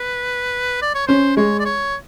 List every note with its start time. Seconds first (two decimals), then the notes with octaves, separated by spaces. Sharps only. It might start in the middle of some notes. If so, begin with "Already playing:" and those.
Already playing: B4
0.82 D5
0.95 C#5
1.07 C#4 C5
1.37 G#3 C#5
1.59 D5
1.65 C#5